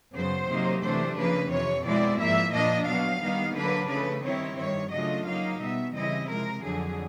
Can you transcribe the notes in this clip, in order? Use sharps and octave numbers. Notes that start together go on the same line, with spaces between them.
F#2 C#3 F#3 B3 C5
C3 D#3 F#3 A#3 D#4
C3 E3 A3 D4 C5
C#3 F3 A#3 B4
F2 C3 E3 C#5
B2 G#3 C4 E4 D5
G#2 F3 A#3 E5
A#2 F3 A#3 D4 D#5
B2 F#3 B3 F5
D#3 G3 B3 D#4
D3 F#3 A#3 D4 B4
C#3 F3 A3 B4
D#3 G3 C4 E4 C#5
G2 D#3 G3 C#5
C#3 F#3 A3 D4 F4 D#5
C#3 F#3 A#3 D#4 F5
B2 G3 B3 E5
C#3 E3 G3 C4 E4 D#5
C3 F3 G#3 A#4
F2 D3 F#3 G#4